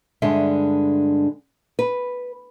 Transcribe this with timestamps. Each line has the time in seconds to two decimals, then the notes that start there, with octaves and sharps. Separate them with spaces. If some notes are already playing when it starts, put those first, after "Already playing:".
0.22 G2 D3 G#3 E5
1.79 B4